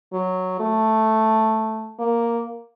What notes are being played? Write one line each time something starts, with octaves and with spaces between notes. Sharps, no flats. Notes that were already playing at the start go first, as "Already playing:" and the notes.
F#3
A3
A#3